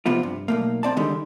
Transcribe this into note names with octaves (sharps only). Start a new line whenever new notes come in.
C3 F3 B3 F4
G2
B1 A3 A#3
C4 D5 A5
D3 D#3 G3 G#3